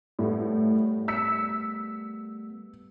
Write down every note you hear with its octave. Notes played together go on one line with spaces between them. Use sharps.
A2 G3 A3 B3
E6 B6 C#7